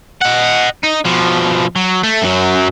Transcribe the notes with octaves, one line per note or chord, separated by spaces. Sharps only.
D#5 F#5
D#4
B2 F3
F#3
A3
F#2 F#3